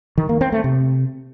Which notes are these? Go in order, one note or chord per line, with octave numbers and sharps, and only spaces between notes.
D#3
A#3
C4
A3
C3